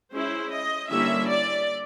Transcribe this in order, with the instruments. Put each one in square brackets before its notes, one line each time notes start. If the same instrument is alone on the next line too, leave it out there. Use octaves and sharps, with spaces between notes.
[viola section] G#3 C#4 E4 C5
D#5
D3 G3 A#3 C#4 E4 E5
D5